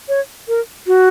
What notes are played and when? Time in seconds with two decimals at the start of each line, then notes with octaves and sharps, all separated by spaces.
0.09 C#5
0.48 A#4
0.87 F#4